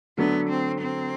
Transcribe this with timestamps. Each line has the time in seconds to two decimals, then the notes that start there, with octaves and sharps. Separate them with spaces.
0.17 D3 F#3 A3 B3 D4
0.49 C4
0.80 C4